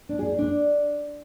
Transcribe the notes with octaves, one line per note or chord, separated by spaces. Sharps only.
D4
G#4
D#4
D4